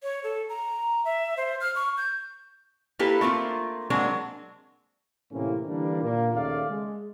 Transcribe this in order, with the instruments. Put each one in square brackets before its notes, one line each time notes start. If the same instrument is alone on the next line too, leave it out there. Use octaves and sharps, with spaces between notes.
[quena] C#5
A4
A#5
E5
C5
F6
C#6
G6
[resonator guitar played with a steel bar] A#3 D4 E4 G4 A4 B4
A3 A#3 C4 F4
F#3 G#3 A#3 C4 D4
[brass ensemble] A2 C3 E3 A#3 C4 C#4
D3 E3 G3 A#3 D4
A#2 A#3
D#2 C#3 A3 D5 F5
G#3